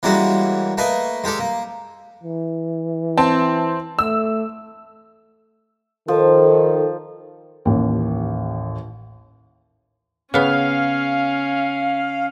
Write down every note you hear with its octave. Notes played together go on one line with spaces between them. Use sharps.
E3 G3 G#3 A#3 C#4 F#4
A3 A#3 B4 D#5 G#5
G#3 G4 A4 D5
A#3
E3
C4 A5
A3 E6
D#3 F3 A4
A1 D#2
C#3 B3 C#4 F5